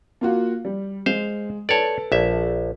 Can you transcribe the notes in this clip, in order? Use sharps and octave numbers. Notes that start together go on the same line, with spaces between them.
A#3 F4 F#4
G3
G#3 C5 F5
A4 B4 C#5 D5 A5
A#1 E5